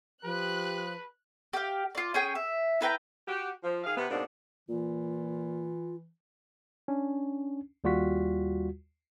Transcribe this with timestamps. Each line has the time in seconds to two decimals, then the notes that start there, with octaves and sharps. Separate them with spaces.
0.24 F3 G4 B4 F#6
1.53 G4 F5
1.95 F4 D5
2.14 C#4 G#4 G5
2.35 E5
2.81 E4 B4 G5 A#5
3.27 F#4 G4
3.63 F3
3.84 D#3 G#4 F5
3.97 C3 B3
4.10 G#2 B2 A#3 C4 D4
4.69 A#2 E3 F4
6.88 C#4 D4
7.84 D#2 G3 F4 F#4 B6